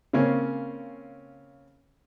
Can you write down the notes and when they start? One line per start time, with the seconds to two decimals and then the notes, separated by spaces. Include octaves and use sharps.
0.13 C#3 A#3 C4 C#4